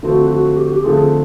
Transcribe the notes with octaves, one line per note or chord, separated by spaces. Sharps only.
D3 F3 A3 C4 F#4
F#4
G4
F#4
G4
D3 F3 A3 C4 G#4